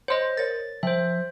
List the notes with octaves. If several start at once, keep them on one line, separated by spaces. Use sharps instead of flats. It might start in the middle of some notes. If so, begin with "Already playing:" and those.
C5 C#5 D#5 C6
A#4 C#5 A6
F3 C5 E5 G5